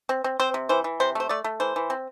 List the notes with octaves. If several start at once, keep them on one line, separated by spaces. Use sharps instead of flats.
C4
C4
C4 C5
C3
E3 C5
E3
C3 C5
A3 C5
A3 D5
A3
E3 C5
E3
C4